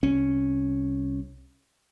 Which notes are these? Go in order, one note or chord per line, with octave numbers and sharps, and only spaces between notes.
C2 C#4